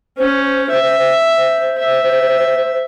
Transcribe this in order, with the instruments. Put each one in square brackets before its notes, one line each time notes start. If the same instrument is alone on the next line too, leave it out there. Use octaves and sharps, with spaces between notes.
[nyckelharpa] C#4 [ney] C5
[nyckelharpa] E5
[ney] C5
[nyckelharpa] E5